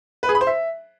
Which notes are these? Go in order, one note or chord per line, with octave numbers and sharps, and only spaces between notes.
B4
G#4
B5
C5
E5